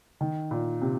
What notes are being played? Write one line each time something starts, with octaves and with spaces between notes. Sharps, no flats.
D#3
A#2
C3